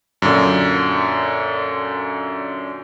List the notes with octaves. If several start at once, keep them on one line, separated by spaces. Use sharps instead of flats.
F#2 A#2 D3